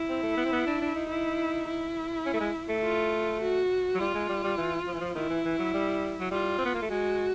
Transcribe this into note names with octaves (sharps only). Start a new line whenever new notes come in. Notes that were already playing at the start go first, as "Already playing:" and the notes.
Already playing: E4
C4
A3
B3
C4
B3
D4
D4
D#4
E4
E4
C#4
A3
G#3
A3
F4
F#4
F#3
G3 F4
G#3
G3
G3
E3
F3
E3
F3
D#3 E4
E3
E3
F#3
G3
F#3
G3 F4
C4
B3
A#3
A3
G#3 F#4